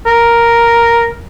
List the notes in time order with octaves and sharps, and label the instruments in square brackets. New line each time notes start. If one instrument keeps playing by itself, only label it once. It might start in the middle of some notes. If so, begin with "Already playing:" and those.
[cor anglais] A#4